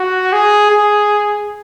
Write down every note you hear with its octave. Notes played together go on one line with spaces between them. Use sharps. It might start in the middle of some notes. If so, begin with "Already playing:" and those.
Already playing: F#4
G#4
G#4